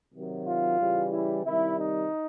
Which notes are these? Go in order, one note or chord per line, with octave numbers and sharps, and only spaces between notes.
C3 D#3 F#3
F4
C#3 E3 G3
E4
C3 D#3 G3 E4
D#4